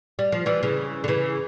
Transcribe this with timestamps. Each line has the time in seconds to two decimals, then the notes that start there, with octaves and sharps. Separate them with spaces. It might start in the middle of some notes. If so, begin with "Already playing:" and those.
0.19 G3
0.32 F3
0.46 E3 G3
0.63 C#3 E3
1.04 D3
1.08 C#3 E3